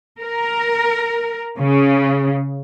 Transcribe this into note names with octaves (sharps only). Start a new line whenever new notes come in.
A#4
C#3